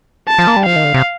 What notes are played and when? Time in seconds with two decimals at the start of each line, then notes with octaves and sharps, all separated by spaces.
0.28 A5
0.38 F3
0.47 A#3
0.56 G3
0.66 F3 F5
0.76 D#3
0.84 D3
0.94 C3